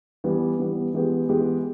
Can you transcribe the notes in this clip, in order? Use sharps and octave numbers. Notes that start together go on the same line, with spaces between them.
E3 G3 B3
E3 G3 B3
E3 G#3 B3 G4
E3 G#3 B3 G4